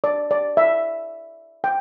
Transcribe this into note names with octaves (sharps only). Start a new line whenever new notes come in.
D5
D5
E5
G5